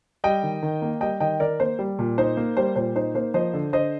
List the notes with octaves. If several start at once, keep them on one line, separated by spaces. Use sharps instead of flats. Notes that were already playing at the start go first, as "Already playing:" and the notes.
G3 D#5 G5
D#3
D#3
A#3
G3 D#5 G5
D#3 D#5 G5
D#3 A#4 D5
A#3 C5
G3
A#2
D#4 C5
A#3
G3 C5
A#2 C5
D#4 C5
A#3 C5
F3 C5 D#5
D3
D3 C5 D#5